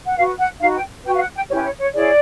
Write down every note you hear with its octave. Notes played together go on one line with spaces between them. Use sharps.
F#5
F#4 B4 F5
F#5
D#4 F#4 B4 F5
G5
F#4 B4 G5
F5
F#5
G5
C#4 E4 G4 B4 C#5
C#5
C#5
E4 G#4 C#5 D5